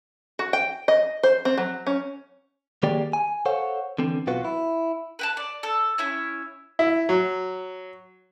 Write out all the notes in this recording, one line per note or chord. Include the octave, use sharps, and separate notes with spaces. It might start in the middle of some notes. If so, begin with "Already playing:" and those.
F#4
G5
D#5
C5
C4
F#3
C#4
D#3 A#3 G4 G#4 D5 G5
G#5
A4 C5 C#5 F5 F#5
D3 E3 C4
B1 B2 F4 F#4 B4
E4
B4 G5 A5
D5
A4
C#4 E4 C#5
E4
F#3